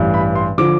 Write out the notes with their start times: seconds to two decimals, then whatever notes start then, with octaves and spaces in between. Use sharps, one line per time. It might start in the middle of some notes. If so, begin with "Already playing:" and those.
Already playing: A1 G2 E3
0.14 B5
0.35 C6
0.58 D3 F3 D6